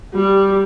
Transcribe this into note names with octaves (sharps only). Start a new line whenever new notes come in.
G3